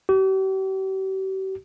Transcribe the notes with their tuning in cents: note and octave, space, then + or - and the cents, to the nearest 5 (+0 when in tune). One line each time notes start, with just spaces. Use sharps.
G4 -45